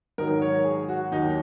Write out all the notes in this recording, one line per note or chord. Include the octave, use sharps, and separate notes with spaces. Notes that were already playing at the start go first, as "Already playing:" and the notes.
G#2 D#3 F#3 A#4
C#5
G#4
F#4
D#2 D#3 F#3 D#4